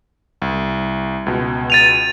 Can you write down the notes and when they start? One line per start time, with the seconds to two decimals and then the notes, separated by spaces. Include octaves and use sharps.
0.42 C2
1.26 C#2 B2
1.70 A6 D#7 F7